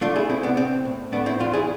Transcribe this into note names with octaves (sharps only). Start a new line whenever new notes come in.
A3 D4 F4
E4 G#4
C3 C4 E4
B3 D4
A2 C4
A2
A3 B3 D4
C4 E4
E2 D4 F4
E4 G#4